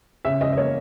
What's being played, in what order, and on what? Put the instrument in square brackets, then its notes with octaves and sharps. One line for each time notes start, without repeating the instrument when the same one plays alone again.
[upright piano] C#3 E5
C#3 D#5
D#5
A#3 C#5